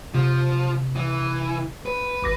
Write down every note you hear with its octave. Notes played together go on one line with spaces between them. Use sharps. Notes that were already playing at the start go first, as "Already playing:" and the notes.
C3 F3
E3
B4
G#1 D6 A#6